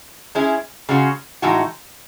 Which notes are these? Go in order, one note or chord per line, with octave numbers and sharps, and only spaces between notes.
G#3 C#4 E4 G#4
C#3 G#3 C#4 F#4
A2 E3 G#3 D#4 F#4